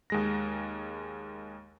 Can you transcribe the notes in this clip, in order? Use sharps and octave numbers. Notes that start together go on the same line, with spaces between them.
D#2 G#3 A#6